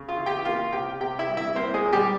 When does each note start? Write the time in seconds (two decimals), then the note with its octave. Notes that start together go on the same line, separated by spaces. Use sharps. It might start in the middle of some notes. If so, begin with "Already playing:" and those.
Already playing: C#3
0.08 F4 F5
0.17 E3
0.26 G4 G5
0.45 A#3 F4 F5
0.73 C3 G4 G5
1.00 C3 G4 G5
1.19 E4 E5
1.28 G3
1.37 E4 E5
1.55 A#3 C4 C5
1.74 G#3 G#4
1.84 A#2
1.93 G3 G4